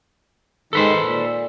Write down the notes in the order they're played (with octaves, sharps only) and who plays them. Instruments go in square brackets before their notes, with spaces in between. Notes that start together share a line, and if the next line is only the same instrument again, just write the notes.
[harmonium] G#2 D#3 [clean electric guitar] A4 B4 C5
[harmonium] A#2